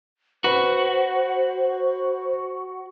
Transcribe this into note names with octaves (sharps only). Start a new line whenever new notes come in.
F#4 B4 C5